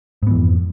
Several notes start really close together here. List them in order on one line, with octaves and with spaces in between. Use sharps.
G#2 B3 E3 F2